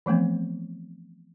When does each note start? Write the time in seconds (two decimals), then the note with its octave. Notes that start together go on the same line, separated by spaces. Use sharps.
0.06 E3 F3 A3 B3 C4